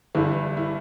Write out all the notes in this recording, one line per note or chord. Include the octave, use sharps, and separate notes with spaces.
G1 G2 E3 E4
E4